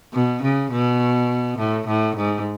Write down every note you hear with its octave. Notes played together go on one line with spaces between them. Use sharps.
B2
C#3
B2
A2
A2
G#2